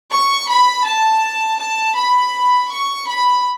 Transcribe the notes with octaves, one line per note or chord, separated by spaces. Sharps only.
C#6
B5
A5
A5
B5
C#6
B5